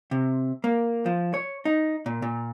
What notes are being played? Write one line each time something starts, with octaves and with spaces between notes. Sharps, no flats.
C3
A#3
F3
C#5
D#4
A#2
A#2